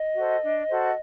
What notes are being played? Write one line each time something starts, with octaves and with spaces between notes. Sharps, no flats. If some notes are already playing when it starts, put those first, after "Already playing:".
Already playing: D#5
F#4 A4 C5
D4
F#4 A4 C5